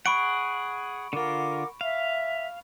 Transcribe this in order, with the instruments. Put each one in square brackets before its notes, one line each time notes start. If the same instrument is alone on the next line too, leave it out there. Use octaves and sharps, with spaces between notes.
[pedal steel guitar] G#4 F#5 [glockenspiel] B5 C#6 D7
[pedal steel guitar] D3 F4 [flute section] A#4 F#5 D6
[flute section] E5 [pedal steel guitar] F5